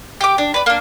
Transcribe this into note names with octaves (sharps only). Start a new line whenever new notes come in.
G4 D6
D4
B4 D5
A#3 D4